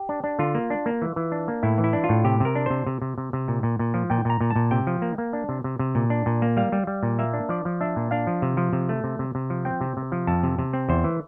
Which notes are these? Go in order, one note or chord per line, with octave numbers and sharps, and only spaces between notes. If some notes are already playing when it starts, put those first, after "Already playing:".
Already playing: G4
D4
D4
D3 F4
A#3
D4
A#3
E3
E3
D4
A#3
A2 E4
E3
E4
D4
F4
A2
C3 G4
C3 A#4
D4
C3 C5
C3
C3
C3
C3
A#2
A#2
A#2
F3
A#2 G5
A#2 A#5
A#2
A5
A#2
C3 G5
F3
A#3
A#3
D4
C3
C3
C3
A#2
D4
A#2
A#3
G3 F5
G3
G3
A#2
A#3 E5
D4
F3 D5
F3
D4 E5
A#2
D4 F5
F3
C3
F3
C3
A3
C3
C3
C3
F3
C4 G5
C3
C3
F3
F2 A5
C3
C3
C4
E2 C5
E3